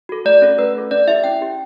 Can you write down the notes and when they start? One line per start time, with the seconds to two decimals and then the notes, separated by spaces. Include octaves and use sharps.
0.09 F#4 A4
0.25 A3 D5
0.42 C#4 F#4 A4
0.58 A3 B4
0.75 C#4 F#4 A4
0.91 C#4 D5
1.07 E4 G4 E5
1.24 C#4 G5
1.41 E4 G4